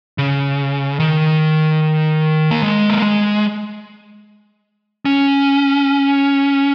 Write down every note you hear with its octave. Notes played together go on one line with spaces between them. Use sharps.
C#3
D#3
A#3
G#3
A#3
G#3
C#4